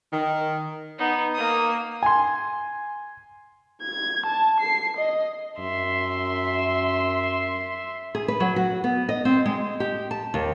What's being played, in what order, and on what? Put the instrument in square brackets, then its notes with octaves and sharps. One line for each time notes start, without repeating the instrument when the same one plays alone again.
[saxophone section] D#3
[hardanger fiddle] B3 D#4
A#3 D#6
[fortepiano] G#5 C6
[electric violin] G#6
A5
C7
D#5
[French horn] F#2 [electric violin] E5 C6
[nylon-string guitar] G#4
B4
F#3
F#4
B3
D#5
C4
G#3
G4
A5
D#2